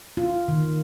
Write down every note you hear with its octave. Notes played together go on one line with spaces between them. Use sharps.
F4
D#3